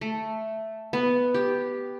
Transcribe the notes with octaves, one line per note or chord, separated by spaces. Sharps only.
A3
B3
G4